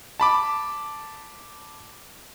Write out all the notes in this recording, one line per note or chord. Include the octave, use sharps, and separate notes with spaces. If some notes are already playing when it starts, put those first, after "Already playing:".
A5 B5 D6